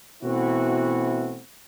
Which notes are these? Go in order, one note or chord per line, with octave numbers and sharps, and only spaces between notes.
B2 E3 A3 C4 E4 F#4